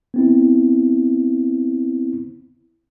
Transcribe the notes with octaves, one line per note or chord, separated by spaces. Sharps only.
B3 C4 E4